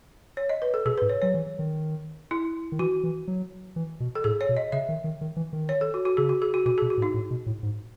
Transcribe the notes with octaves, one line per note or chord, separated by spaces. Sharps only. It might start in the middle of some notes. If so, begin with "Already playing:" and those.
C#5
D#5
B4
A4
B2 G#4
B4
G#2
C#5
F#3 C#5
E3
D#3
E4
D#3
E3 F#4
E3
F#3
E3
B2
A4
A2 G#4
C#5
B2
D#5
C#3 E5
D#3
D#3
D#3
E3
D#3
C#5
A4
F#4
F#4
C#3 G#4
F#4
G#4
F#4
B2 F#4
G#4
B2
F#4
A2
D#4
A2
B2
A2
G#2